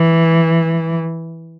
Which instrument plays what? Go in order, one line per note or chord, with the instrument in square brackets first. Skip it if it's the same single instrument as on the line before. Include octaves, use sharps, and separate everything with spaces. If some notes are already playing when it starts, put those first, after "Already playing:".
Already playing: [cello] E3